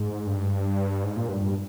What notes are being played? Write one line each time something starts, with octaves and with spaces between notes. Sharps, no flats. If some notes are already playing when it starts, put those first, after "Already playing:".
Already playing: G#2
G2
G#2
A#2
G2
G2